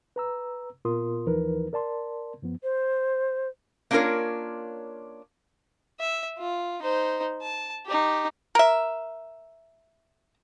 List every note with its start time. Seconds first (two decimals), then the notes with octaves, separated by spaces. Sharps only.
0.16 B4 A#5 E6
0.85 A#2 B3 F4 A#4 C6 D#6
1.26 D#2 E3 F3 D#4 A#4 B4
1.73 A#4 D5 A5 C6
2.42 F#2 F3 B3
2.62 C5
3.91 A#3 C#4 D4 F4 A#4 C#5
6.00 E5
6.39 F4
6.82 D#4 C5
7.42 A5
7.86 D#4 G4
8.55 A#4 E5